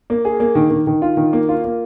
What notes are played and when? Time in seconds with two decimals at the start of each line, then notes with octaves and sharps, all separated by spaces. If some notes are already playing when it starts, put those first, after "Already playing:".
0.10 A#3
0.25 G#4
0.40 A#3
0.55 D#3
0.71 D#3
0.87 D#3
1.02 F4
1.17 D#3
1.33 A#3
1.49 F4
1.64 A#3